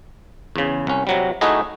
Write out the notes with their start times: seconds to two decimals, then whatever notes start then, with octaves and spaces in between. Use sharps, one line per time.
0.56 E2 C#3
0.87 C2 C#4
1.07 C3 F#3 G3
1.41 A3 D#4 E4 F#4 G#4 D#5